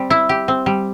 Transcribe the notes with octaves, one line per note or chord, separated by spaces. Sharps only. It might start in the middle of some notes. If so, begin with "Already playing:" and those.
Already playing: G3 C4
E4
G4
C4
G3